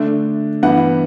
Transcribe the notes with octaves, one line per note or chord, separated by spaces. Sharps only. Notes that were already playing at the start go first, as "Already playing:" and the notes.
Already playing: D3 A3 D4
G2 E3 B3 F#5